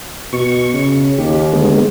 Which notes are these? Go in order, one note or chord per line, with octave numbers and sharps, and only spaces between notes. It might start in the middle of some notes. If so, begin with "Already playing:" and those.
B2 C#6
C#3
D#2 G4
D3 G#3 B3